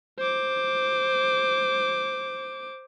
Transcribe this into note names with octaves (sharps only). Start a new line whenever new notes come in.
C5 D6